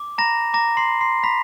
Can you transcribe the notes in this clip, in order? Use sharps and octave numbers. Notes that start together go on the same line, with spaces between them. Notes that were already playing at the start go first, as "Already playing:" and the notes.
Already playing: D6
A#5 B5 A#6
A#5 D6 A#6
C6 C7
B5
C6 C7
B5 B6